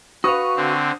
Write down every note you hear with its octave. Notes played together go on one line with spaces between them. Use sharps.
F#4 B4 F5 C#6 D#6
D3 C4